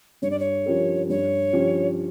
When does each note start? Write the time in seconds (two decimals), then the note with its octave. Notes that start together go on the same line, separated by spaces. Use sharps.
0.22 G2 C#5
0.31 D5
0.39 C#5
0.66 F3 C#4 G4 A#4
1.09 G2 C#5
1.53 F3 C#4 G4